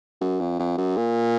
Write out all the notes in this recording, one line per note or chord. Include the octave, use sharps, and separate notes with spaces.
F#2
F2
F2
F#2
A#2